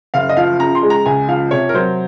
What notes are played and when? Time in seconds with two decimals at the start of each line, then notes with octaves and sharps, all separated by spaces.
0.14 F#1 F5
0.29 D#5
0.37 F3 F5
0.59 C#3 A#5
0.75 C6
0.83 G#3
0.90 A#5
1.05 C#2 G#5
1.28 F3 F5
1.51 C3 C#5
1.69 A#4
1.74 F#3 C5